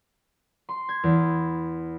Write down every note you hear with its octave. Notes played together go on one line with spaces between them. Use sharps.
C6
G#6
E2